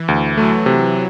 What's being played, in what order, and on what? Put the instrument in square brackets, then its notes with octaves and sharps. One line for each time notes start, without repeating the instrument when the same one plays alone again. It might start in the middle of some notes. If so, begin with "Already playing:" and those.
Already playing: [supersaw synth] E3
[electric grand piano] D2
[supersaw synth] F#3 [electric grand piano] A3
[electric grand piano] C3